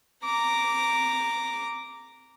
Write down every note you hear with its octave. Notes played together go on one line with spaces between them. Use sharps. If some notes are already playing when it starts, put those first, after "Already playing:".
A#5 D6